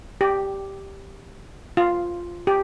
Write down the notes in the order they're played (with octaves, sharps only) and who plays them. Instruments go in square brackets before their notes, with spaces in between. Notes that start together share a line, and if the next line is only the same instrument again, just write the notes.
[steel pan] G4
F4
G4